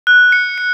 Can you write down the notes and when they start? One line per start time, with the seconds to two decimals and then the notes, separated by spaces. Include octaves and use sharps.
0.07 F#6
0.32 C#7
0.58 C#7